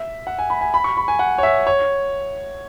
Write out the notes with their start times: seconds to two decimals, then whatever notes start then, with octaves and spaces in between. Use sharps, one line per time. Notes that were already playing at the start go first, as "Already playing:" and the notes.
Already playing: E5
0.27 F#5
0.39 G#5
0.50 B5
0.61 G#5
0.74 B5
0.84 C#6
0.97 B5
1.08 G#5
1.19 F#5
1.38 C#5
1.43 E5
1.67 C#5